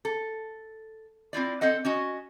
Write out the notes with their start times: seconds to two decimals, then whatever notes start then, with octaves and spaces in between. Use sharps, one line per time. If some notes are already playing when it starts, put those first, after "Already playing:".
0.05 A4
1.33 C4 E4 F4 D5
1.61 C4 A4 D#5 F#5
1.85 C#4 F#4 D#5